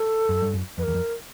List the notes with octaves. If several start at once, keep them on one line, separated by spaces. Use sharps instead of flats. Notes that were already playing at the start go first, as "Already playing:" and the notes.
Already playing: A4
F#2
G2
F#2
F2 B4
E2 A#4
F2